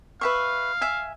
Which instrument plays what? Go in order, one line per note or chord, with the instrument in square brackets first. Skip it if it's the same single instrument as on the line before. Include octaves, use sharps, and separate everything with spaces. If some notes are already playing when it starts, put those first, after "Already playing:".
[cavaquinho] B4 E5 C#6 [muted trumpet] F5
[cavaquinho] E5 G#5